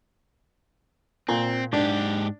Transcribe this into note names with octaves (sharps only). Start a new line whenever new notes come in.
A#2 C4
G#2 D4 G4